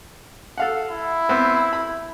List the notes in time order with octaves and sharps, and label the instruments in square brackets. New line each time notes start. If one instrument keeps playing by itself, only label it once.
[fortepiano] A4 F5 F#5
[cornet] E4
[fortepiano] B3 C4 C5
B5